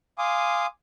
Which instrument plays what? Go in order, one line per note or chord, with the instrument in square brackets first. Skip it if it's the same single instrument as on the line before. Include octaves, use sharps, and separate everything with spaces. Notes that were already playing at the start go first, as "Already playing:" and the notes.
[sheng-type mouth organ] F5 G#5 C6 D6 D#6